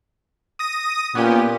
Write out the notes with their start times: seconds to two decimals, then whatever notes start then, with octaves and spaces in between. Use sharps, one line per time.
0.59 D#6 A#6 D#7
1.15 A#2 B3 C#4 G4